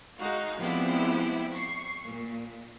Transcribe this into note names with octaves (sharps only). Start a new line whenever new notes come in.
G#3 D#4 F#4 F5
F3 G3 G#3 B3 C4 E4
C#6 C7
A#2